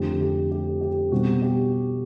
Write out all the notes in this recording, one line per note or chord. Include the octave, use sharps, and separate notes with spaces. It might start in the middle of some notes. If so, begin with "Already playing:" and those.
Already playing: F2 D3 F3 A3 G4
G4
G4
G4
B2 G3 C4 F#4
G4